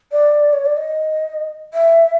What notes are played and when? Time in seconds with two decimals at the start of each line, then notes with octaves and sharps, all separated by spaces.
0.12 D5
0.53 C#5
0.65 D5
0.77 D#5
1.74 E5